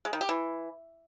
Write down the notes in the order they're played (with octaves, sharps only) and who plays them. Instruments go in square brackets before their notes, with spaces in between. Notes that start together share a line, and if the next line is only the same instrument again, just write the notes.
[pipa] G#3
D#3
G4
E3